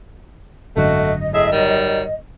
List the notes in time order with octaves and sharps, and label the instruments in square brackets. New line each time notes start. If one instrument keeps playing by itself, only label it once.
[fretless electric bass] G#1 F#2 D3 [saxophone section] A3 F#4 [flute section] D#5
[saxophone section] A2 G#4 E5
D#3 F#3 G3